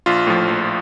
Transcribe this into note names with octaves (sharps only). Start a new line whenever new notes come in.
A#1 F4
A2 F3
A#1